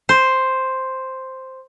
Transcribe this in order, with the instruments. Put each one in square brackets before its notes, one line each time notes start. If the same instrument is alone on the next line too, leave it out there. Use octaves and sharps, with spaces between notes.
[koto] C5